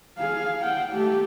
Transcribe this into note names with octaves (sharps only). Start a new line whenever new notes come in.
G#4 F5
F#5 G5
A3 G4